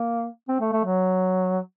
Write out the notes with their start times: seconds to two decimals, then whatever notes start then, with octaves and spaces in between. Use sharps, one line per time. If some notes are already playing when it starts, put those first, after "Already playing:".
Already playing: A#3
0.48 C4
0.60 A3
0.73 A3
0.84 F#3